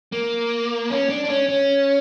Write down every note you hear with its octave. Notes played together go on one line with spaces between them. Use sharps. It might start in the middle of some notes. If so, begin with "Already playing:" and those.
A#3
C#4
D4
D4
C#4
C#4